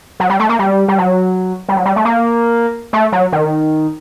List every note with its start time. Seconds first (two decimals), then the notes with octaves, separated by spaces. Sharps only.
0.20 F#3
0.30 G3
0.40 A3
0.49 A#3
0.59 G3
0.88 G3
0.98 F#3
1.68 G3
1.76 F#3
1.85 G3
1.96 A3
2.05 A#3
2.93 A3
3.12 F#3
3.32 D#3